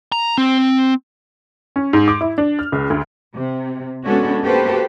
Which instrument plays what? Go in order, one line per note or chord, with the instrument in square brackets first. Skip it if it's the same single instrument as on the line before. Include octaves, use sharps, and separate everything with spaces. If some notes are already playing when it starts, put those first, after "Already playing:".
[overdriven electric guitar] A#5
C4
[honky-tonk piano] C#4
G#2
D6
E4
D4
F6
C#2
D2
[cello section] C3
G#3 B3 C#4 D4 F#4 A4
A#3 F#4 G4 A4 B4 C5